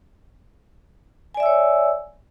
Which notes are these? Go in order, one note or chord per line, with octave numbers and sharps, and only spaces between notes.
C#5 D5 E5 G#5 E6